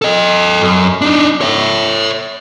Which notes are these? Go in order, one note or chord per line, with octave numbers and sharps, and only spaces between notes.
A4 D#5
F#2
D4 D#4
C#5 E5